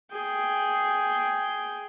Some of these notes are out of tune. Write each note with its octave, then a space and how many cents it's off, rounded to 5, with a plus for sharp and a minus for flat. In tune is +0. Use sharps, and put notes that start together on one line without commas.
G#4 +5 G5 +0